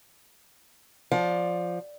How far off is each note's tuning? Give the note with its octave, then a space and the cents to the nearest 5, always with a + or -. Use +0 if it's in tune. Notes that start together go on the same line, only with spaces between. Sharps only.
F3 +0 D5 +0 F5 +30